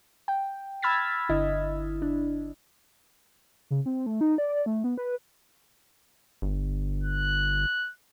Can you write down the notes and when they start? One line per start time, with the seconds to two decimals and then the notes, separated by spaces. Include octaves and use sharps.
0.28 G5
0.82 B5 E6 F6 G#6 A6 B6
1.29 G1 D3 E4 D#5
2.02 D4
3.70 C#3
3.86 C4
4.06 A3
4.21 D#4
4.38 D5
4.66 A3
4.84 B3
4.98 B4
6.42 G1
7.03 F#6